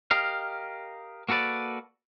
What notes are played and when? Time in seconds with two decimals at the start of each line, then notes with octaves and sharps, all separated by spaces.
0.11 G4 A#4 D#5 F5
1.29 A#3 F#4 A4 B4 D5